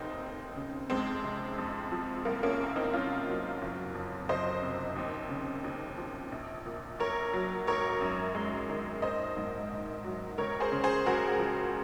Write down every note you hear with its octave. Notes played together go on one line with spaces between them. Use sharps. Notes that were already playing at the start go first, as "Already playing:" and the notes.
Already playing: F1 D#2 C4 D#4
F1
C#3
F2 G#3 C4
C3
F2
F3
C2 A#3
A#3 C#4
C3
C4 D#4
C2 C#4 F4
F#3
F#1
F2
F#1 C5 D#5
C3
D#2
C#3
D#2
F3
A#1
A#2
A#1 A#4 C#5
F#3
G#1 A#4 C#5
F#2
G#3
D#3
A#1 C5 D#5
G#2
A#1
F#3
C#2 A#4 C#5
G#4 C5
C#3
G#4 C5
C#2 F#4 A#4
F3